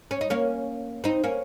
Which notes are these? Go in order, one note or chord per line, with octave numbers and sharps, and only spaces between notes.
C#4
D#4
A#3 C#4
C4 D#4
A#3 C#4